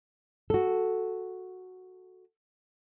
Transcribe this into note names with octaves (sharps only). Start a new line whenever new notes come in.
F#4 A4